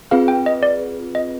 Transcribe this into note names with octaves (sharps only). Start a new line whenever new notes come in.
C4 F4 G#4 B4 F5
G5
D#5
D5
D#5